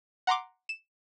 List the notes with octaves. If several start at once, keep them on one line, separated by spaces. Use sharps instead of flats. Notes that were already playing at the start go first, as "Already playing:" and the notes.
F#5 A#5 C6 D6
E7